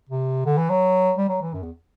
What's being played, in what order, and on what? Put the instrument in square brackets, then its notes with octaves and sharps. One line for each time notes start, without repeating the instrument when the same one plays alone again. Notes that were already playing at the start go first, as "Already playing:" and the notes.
[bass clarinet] C3
D3
E3
F#3
G3
F#3
E3
F#2
E2